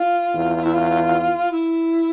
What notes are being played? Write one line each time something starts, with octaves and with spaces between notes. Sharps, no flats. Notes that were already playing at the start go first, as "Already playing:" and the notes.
Already playing: F4
E2
E4
F4
E4